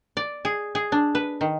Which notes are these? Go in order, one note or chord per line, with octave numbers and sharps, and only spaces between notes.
D5
G#4
G#4
D4
B4
D#3